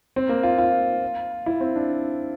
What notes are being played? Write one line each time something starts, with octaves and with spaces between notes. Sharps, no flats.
C4
A#3
F4
F4
E4
C4
D4